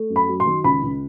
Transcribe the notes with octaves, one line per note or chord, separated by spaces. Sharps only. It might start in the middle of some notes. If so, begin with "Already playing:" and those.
Already playing: A3
F#2
B5
F#3
C6
D#3
C#2 B5
C#2